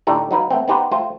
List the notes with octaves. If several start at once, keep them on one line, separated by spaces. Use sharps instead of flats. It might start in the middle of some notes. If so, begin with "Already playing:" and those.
A2 D3 D4 D#4 G4
F#3 D#4 B4 F5
A3 B3 C4
B3 D#4 G4 B4 C5 F#5
A3 F4 C5 G5